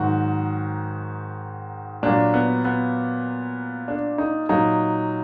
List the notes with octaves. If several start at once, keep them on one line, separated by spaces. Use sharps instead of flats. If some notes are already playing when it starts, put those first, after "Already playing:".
Already playing: G#2 D#3 F#3 F#4
A#2 F#3 D4
B3
B3
D4
D#4
A#2 F#3 D#4